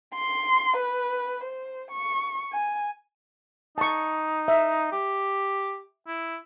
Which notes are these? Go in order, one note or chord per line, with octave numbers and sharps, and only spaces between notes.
C6
B4
C5
C#6
G#5
D#4 A5 C#6
E5
G4
E4